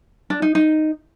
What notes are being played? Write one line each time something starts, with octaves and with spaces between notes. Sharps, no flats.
D4
D#4
D#4